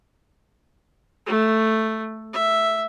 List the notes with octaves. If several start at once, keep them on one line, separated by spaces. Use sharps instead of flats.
A3
E5